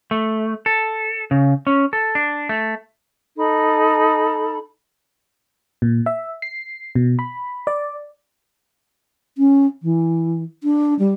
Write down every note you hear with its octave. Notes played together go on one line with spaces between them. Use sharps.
A3
A4
C#3
C#4
A4
D4
A3
D#4 A4 B5
A#2
E5
C7
B2
B5
D5
C#4
E3
D4
G3